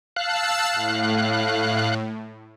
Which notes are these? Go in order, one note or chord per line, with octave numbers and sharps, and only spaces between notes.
F5 A5 E6 F#6
A2